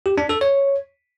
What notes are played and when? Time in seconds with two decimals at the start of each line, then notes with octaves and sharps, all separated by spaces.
0.06 G4
0.18 D4
0.29 A4
0.41 C#5